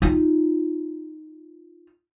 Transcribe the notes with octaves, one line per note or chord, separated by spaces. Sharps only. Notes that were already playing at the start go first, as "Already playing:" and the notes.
D#4 F4